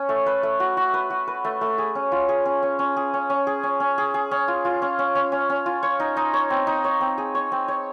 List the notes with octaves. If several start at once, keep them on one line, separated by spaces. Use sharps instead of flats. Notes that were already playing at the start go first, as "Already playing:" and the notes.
Already playing: C#4
A3
B4
A3
F#4
F#4
B4
F#4
B4
A3
A3
G#4
C#4
F4
G#4
C#4
C#4
C#4
G#4
C#4
C#4
G#4
C#4
C#4
G#4
G#4
C#4
F4
F4
C#4
C#4
C#4
C#4
C#4
F4
C#5
D#4
D#4
C#5
C4
D#4
C#5
C4
G#4
C#5
C4
C#5